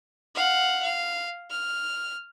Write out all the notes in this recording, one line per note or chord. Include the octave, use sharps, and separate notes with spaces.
F5 F#5
F5
F6